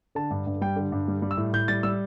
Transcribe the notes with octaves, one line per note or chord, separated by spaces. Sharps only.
D3 A5
G2
G2
G3 G5
D3
G2
G3
G3
E6
A2
A2 G6
G3 A6
G3 E6